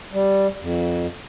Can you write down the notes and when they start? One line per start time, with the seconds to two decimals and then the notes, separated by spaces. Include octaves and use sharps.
0.13 G3
0.61 F2